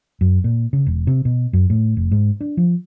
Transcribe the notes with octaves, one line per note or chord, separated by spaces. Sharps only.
F#2
A#2
C#3
E1
C3
B2
F#2
A2
F1
G#2
D4
F3